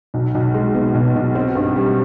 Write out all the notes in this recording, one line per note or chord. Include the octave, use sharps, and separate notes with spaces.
B1
B1
G#3
B2
B1
B1
C4
G2
G3